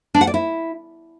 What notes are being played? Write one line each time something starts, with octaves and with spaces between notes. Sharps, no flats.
D4
F#5
D5
E4